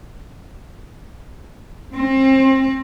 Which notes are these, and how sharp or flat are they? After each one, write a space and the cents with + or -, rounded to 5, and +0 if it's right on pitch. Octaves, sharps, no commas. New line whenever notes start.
C4 +30